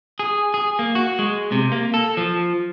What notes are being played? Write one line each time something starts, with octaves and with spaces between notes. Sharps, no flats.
G#4
G#4
A#3
F#4
G#3
C3
A#3
A4
F3